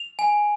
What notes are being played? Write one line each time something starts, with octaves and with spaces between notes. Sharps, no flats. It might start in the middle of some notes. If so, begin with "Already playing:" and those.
Already playing: F7
G#5